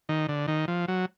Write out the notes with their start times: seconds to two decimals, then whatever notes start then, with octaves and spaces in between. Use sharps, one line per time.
0.09 D#3
0.29 D3
0.48 D#3
0.68 F3
0.88 F#3